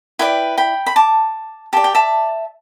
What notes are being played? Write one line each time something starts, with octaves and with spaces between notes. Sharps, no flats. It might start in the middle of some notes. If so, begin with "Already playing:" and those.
E4 B4 D5 G5
G5 B5
B5
A5 D6
G4 D5 A5
G5
E5 A5